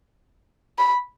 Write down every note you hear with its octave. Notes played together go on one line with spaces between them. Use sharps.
B5